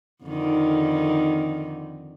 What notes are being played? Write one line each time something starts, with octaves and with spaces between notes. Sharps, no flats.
F2 D3 D#3